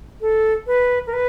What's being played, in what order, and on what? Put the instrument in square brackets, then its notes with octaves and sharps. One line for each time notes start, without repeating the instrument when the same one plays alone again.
[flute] A4
B4
A#4
B4